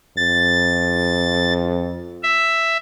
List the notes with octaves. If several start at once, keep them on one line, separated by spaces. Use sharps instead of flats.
F2 A6
E5